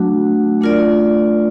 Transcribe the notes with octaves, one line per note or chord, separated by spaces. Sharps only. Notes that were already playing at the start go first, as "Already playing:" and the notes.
Already playing: F#3 A3 D4 F#4
A3 D4 F4 A#4 D5